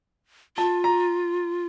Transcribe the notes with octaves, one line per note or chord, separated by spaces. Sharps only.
F4 A5
A#5